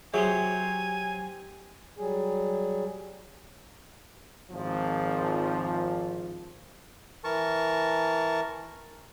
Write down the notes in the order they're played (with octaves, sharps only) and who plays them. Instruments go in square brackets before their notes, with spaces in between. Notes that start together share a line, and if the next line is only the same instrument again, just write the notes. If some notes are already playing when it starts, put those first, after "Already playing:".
[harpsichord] F#3 [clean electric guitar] G4 C5 [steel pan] G#4 E5 [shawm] G#5
[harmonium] F#3 G3 G#4
[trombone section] G#1 F3
[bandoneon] E3 A#4 A5 C#6